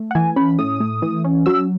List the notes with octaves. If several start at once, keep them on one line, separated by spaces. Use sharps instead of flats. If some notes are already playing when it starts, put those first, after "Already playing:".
Already playing: A3
F#5
E3 G#5
C#4 B5
A2 D#6
A3
E3
C#4
F#3 E6